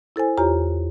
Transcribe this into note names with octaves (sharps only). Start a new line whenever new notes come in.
E4 A4 C5 G#5
E2 F4 G4 C#5 A#5